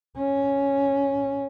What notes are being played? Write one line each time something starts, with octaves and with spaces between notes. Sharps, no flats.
C#4